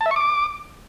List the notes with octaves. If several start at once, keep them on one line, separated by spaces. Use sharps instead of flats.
A5
E5
C#6
D6